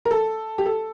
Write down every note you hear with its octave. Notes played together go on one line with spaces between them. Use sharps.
A#4
A4
G4
A4